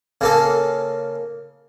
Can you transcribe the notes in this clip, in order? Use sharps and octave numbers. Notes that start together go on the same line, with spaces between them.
C#3 A#3 A4